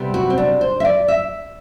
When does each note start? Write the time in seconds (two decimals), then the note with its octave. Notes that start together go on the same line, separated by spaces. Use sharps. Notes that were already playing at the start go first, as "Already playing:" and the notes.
Already playing: C3 G3 B3
0.14 F#4
0.30 C4
0.38 D4
0.61 C5
0.80 E5
0.85 D5
1.08 E5